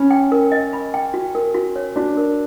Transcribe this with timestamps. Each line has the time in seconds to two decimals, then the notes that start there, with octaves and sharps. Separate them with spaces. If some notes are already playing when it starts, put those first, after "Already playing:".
Already playing: C#4 B5
0.11 G5
0.32 A#4
0.52 D#5
0.73 B5
0.94 G5
1.14 F#4
1.35 A#4
1.54 F#4
1.76 C#5
1.96 D4 F#4
2.17 A#4